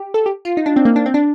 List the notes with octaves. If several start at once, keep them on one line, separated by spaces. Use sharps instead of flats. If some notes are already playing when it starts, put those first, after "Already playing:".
Already playing: G4
A4
G4
F4
D#4
D4
C4
A#3
D4
C4
D4